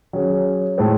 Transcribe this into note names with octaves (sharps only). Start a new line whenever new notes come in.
F#3 C#4 G#4
A2 G#3 C4